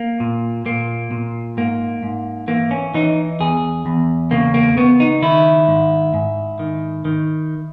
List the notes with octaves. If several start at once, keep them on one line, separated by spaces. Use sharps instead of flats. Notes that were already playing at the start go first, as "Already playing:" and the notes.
Already playing: A#3
A#2
A#2 A#3
A#2
G#2 A#3
G#2
E3 A#3
C#4
E3 D#4
E2 G#4
E2
C#3 A#3
A#3
C#3 B3
D#4
D#3 E4
G#2
G#2
D#3
D#3